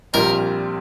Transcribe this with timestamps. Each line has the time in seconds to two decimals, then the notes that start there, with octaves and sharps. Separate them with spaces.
0.13 A#1 A#2 G3 C4 A#4